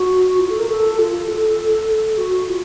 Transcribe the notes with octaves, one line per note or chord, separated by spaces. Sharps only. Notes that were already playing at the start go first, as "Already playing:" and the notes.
Already playing: F#4
F4
A4
A#4
A4
F4
A4
F#4
F4